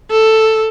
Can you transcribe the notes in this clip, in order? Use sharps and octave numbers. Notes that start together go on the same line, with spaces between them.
A4